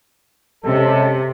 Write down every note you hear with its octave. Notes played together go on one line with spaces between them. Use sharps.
C3 G#3 C#4 A4